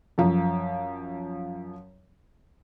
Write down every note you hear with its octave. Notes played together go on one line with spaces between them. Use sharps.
F#2 F3